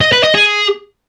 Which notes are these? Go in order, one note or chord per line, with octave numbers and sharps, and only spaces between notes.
D#5
B4
D#5
G#4